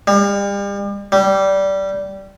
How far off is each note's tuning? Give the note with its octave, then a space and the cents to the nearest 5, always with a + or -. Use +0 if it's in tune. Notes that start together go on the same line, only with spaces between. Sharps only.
G3 +40
G3 -15